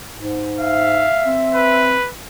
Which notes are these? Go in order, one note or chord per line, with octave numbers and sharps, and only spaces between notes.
G#2
E5 F5
C4
B4